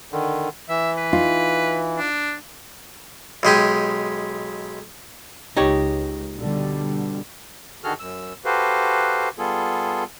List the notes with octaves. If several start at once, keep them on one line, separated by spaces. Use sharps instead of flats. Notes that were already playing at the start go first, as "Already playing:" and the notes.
D3 D#3
E3 E5
B4
D#4 F4
D4
B1 G#3 G4 G#5
C#2 D#4 G4 C#5
B2 D3 G3
D3 D#3 F#4 G#4 A4 F6
F#2 E6
F#4 G4 A4 B4 C5 F5
G3 B3 F4 G#4 A4